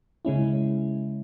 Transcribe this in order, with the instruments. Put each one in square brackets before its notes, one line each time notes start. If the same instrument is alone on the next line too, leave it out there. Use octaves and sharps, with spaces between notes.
[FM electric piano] C#3 G#3 C#4 E4